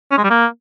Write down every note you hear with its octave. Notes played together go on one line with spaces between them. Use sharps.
C#4
G#3
G3
A#3